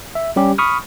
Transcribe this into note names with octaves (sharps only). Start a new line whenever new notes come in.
E5
G3 C#4 G4
B5 C#6 D#6 F6